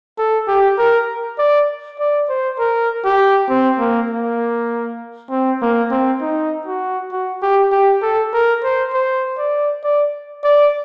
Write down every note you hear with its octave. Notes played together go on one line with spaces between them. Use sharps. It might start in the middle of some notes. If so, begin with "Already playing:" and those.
A4
G4
A#4
D5
D5
C5
A#4
G4
C4
A#3
A#3
C4
A#3
C4
D#4
F#4
F#4
G4
G4
A4
A#4
C5
C5
D5
D5
D5